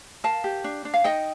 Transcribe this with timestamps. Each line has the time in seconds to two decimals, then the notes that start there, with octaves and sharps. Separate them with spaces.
0.24 A#4 F5 A5
0.44 G4
0.64 D4
0.85 D4
0.94 F5
1.04 D#4 D#5 G5